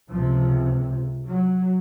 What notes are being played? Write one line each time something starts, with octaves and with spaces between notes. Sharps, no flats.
C#2 C3 F3
F#3